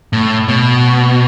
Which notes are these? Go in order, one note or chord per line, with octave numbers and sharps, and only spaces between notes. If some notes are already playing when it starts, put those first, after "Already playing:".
A2
B2